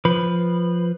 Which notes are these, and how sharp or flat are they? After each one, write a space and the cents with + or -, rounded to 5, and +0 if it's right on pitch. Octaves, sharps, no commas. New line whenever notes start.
F3 +0 B4 +0